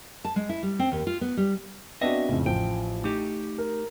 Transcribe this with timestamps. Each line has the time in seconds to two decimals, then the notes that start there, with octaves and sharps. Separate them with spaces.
0.25 A5
0.36 G#3
0.49 E4
0.63 G3
0.79 C4
0.92 D#2
1.07 F4
1.21 B3
1.37 G3
2.01 B3 C4 D4 F#4 D#5 E5
2.29 F2 A2 C#3
2.46 A1 F3 G5
3.04 A3 D#4 G4 D6
3.58 A#4